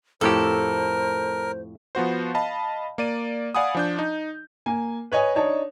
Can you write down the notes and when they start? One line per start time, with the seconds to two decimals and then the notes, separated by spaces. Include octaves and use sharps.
0.21 F2 A2 G4 A4 A#4 C5
1.95 F3 B3 F#4 C5
2.35 D#5 F5 A5 B5
2.98 A#3 D5 D#7
3.55 D5 F5 F#5 G#5 B5 D#6
3.75 F3 D4 G6
3.99 D#4
4.66 A#3 G#5
5.12 B4 C#5 D#5 G#5
5.35 D4 D#4 C#5 A5